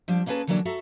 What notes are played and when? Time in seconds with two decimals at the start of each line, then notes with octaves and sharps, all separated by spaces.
0.08 F3 G3 D4
0.26 A#3 C#4 D#4 G#4 B4 A5
0.47 D3 E3 F#3 A#3 C#4 D4
0.65 F#4 A4 E5 A#5